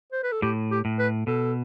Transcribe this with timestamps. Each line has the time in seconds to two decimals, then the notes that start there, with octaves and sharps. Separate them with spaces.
0.12 C5
0.23 B4
0.32 A4
0.42 A2 G4
0.71 G4
0.85 A2
0.99 B4
1.27 B2 A4